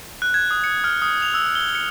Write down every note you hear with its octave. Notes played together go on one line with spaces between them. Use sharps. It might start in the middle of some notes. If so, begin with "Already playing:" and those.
F#6
G#6
D#6
C#7
F6
D#6
F7
E6
G7
C#7